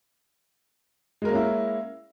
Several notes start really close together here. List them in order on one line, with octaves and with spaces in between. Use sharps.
G#3 A#4 A#3 C#4 E4